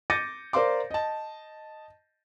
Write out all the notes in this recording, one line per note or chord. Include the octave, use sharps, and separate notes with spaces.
D6 G6 A6 A#6 C#7 D#7
A#4 C5 D5 F5 C6 D6
D#5 A5